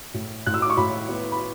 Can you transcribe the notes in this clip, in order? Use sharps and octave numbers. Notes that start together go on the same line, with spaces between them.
A2
A2 F#6
E6
D6
C#6
A2 B5
B3
B5